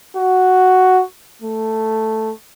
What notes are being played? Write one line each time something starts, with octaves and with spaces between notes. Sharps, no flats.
F#4
A3